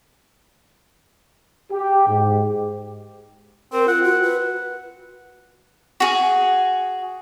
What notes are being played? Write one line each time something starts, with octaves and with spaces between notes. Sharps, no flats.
G4
G#2
C4 A#4
F4 F#5
F#4
B4
F#4 G#4